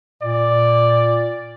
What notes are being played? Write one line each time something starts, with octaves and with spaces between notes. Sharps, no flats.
A#2 D5